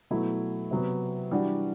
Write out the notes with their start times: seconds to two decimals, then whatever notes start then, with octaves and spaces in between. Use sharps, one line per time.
0.10 B2 F#3 A3 E4
0.71 C3 F#3 B3
1.31 E3 G3 D4 F#4